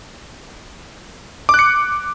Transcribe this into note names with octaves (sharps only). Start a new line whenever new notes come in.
D6 F#6 C#7